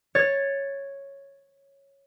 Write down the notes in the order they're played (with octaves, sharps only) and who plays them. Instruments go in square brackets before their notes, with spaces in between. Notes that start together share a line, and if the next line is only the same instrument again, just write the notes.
[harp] C#5 A6